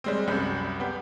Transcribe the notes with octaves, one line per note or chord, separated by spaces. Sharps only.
G3 G#3 C4
C2 F#2 G3 B5 G6
B3 G4